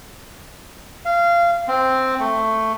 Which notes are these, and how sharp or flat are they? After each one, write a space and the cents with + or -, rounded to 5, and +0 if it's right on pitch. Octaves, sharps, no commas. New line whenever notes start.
F5 -20
C4 +0
A3 +10